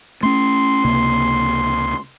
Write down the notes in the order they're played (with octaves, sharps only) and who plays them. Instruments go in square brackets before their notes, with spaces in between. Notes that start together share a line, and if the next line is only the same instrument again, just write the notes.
[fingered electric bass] A3 C#4 [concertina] C6
[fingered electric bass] C#2 C3 A#3